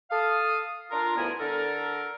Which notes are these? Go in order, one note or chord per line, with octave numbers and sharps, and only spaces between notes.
A4 F5 D#6
D4 F4 A#4
D2 G2 B3 E4 A#4 G#5
D3 A4 A#4